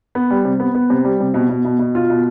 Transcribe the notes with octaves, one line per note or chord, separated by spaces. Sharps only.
B3
G3
C3
B3
B3
C3
G3
C3
B2
B2
B2
B2
F4
B2